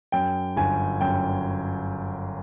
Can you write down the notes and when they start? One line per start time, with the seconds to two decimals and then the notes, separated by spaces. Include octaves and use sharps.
0.12 F#2 G5
0.56 G1 G#5
1.01 F#2 G5